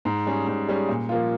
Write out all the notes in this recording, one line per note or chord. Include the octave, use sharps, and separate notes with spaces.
G#2
G3 C#4 G#4
G#2
G3 C#4 G#4
A#2
F3 A#3 F4